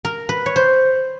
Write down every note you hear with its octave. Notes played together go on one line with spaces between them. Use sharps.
A#4
B4
C#5
C5